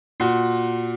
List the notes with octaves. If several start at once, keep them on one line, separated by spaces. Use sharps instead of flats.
A#2 F#4